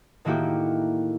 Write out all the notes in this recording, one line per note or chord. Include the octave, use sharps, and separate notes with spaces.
A2 D#3 A#3 E4 F#4 G4